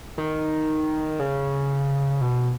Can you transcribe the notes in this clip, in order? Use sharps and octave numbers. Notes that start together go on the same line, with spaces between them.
D#3
C#3
B2